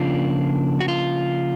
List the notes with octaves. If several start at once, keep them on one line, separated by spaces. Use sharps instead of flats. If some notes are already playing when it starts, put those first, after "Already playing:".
Already playing: C#3 F3 A#3 D4 F4
F#4
F4